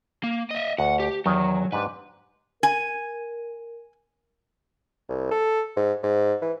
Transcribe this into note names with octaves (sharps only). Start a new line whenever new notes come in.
A#3
D#5 E5
D2 F#5
G4
E2 D#3 F#3 G#5
G#2 D4 G4 B4
A#4 G#5
C2
A4
G#2
G#2
E3